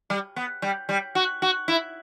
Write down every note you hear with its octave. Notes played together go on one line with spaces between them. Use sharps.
G3
B3
G3
G3
F#4
F#4
E4